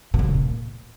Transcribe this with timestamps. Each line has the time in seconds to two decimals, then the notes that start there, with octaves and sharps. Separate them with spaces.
0.14 B2
0.19 D3
0.24 C#3
0.29 B2
0.34 A#2